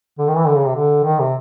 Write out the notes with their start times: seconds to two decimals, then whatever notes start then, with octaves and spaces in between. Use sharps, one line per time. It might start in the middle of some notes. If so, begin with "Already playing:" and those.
0.19 D3
0.28 D#3
0.37 E3
0.47 D3
0.56 C#3
0.67 C3
0.76 D3
1.04 D#3
1.19 C3